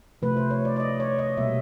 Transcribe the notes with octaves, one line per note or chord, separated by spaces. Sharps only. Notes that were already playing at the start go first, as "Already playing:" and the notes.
C3 F3 A3 B4
C5
C#5
D5
D5
D#5
C#5
D#5
B2 G3 A#3 E5